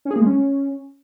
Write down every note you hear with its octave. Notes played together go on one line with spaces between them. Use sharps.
C#4
G#4
A#3
G#3
C#4